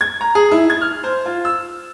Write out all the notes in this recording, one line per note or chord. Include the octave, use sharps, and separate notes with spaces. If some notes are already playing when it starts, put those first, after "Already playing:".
G#6
A#5
G#4
E4
G#6
F6
C5
F4
E6